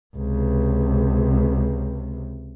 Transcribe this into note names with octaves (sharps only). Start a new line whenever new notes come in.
C#2 C3